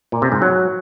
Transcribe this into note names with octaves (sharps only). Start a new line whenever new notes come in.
A#2
C3
G#2
F#3